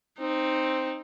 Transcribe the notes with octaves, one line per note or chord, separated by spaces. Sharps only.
C4 D#4